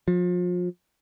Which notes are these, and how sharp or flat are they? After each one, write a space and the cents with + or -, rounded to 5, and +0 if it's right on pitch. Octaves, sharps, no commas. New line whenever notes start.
F3 +35